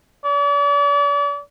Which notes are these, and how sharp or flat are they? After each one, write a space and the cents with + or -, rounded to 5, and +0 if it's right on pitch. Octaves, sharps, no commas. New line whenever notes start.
D5 -40